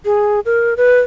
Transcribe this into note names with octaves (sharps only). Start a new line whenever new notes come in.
G#4
A#4
B4